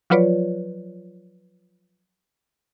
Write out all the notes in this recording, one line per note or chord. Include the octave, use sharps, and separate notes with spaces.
F3 F#3 F4 B4 C#5 D5